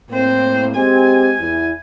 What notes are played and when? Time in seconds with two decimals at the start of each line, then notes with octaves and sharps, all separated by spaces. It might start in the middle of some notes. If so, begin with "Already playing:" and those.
0.10 A2 A#3 C4 C5
0.76 G#3 C4 G4 G#5
1.40 E2 E4